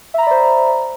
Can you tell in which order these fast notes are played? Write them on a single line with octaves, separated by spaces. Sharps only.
E5 A#5 B5 D5 C5